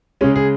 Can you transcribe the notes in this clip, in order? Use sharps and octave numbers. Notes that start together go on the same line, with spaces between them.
C#3 G#3 C#4
G#4